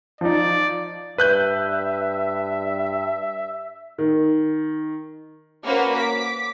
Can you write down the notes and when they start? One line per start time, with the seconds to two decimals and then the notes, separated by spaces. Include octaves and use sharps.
0.21 F3 D#4 D5
1.18 G2 B4 E5 F#6 G6
3.98 D#3
5.64 A#3 C#4 F#4 B4 C5
5.97 D6 B6